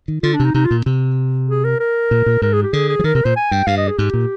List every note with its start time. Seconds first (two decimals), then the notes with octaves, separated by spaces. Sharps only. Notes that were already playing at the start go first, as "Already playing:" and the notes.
0.08 D#3
0.23 D3 F4
0.34 D4
0.40 C3 D#4
0.54 C3 D#4
0.65 F4
0.71 A#2
0.86 C3
1.48 G#4
1.64 A#4
1.80 A#4
2.11 A#2
2.26 A#2
2.42 G#2 A#4
2.53 G#4
2.63 G4
2.73 D3 G#4
2.89 G#4
2.99 F3
3.04 D#3 A#4
3.15 C3 A#4
3.25 A#2 C5
3.36 G#5
3.51 G2 G5
3.67 G2 F5
3.78 D#5
3.88 G#4
3.98 G#2 G4
4.14 A#2